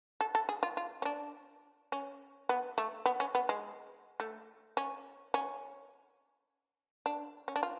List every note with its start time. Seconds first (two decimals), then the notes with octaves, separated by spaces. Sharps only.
0.21 A4
0.35 A4
0.49 G#4
0.63 F4
0.77 F4
1.02 C#4
1.05 D4
1.92 C#4
2.49 B3
2.78 A3
3.06 B3
3.20 C#4
3.35 B3
3.49 G#3
4.20 A3
4.77 C#4
5.34 C#4
7.06 D4
7.48 C#4
7.56 D4
7.63 F4